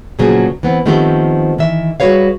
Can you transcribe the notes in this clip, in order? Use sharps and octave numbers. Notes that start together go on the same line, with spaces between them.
A#2 C#3 F3 F#3 B3 G#4
E3 B3 C4
D#3 F3 A3 B3 C4 G4
D#3 E3 E5
G3 F#4 G#4 B4 C#5 F5